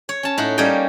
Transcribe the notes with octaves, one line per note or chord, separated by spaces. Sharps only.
C#5
C#4 A5
A2 D#4 F#5
G3 A#3 C#4 C#5 D#5 G5